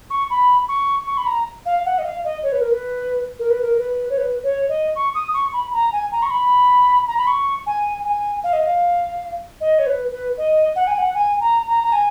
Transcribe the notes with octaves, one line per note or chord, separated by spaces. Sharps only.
C#6
B5
C#6
C#6
B5
A#5
F5
F#5
D#5
F5
D#5
C#5
B4
A#4
B4
A#4
B4
A#4
B4
C#5
B4
C#5
D#5
C#6
D#6
C#6
B5
A#5
G#5
A#5
C#6
B5
A#5
B5
C#6
G#5
G#5
F5
D#5
F5
D#5
C#5
B4
B4
D#5
F#5
G#5
F#5
G#5
A#5
A#5
A#5
G#5